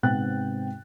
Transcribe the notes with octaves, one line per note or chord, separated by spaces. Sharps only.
G#2 C3 B3 G5 F#6 A6